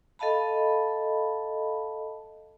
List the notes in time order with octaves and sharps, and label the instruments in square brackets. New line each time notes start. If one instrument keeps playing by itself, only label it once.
[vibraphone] A4 D#5 F5 A5 B5